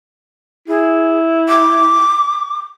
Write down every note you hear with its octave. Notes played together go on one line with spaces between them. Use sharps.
E4 G#4
D6